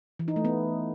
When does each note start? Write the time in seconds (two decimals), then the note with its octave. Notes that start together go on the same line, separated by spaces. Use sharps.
0.19 E3
0.28 D#4
0.36 A3
0.45 B3